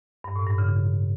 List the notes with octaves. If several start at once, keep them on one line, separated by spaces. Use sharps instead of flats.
G2
A2
G2
C#3